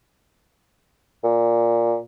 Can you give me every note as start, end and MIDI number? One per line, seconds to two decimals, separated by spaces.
1.23 1.98 46